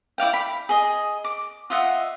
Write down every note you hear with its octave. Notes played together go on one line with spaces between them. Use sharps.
E4 D5 F5 G5
B5
G#4 D#5
D6
F4 D#5 E5 F#5